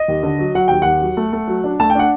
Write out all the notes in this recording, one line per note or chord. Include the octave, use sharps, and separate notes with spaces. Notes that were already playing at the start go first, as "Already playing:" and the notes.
Already playing: D#5
D#2
D3
F#3
F#3 F#5
D#2 G5
D#2 F#5
F#3
A3
A3
F#3
D4
A3 A5
G5
D4 F#5